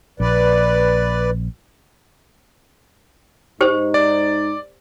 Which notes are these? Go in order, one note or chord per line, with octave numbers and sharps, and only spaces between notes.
A#1 B4 D5
G#2 D#4 G4 C5
D5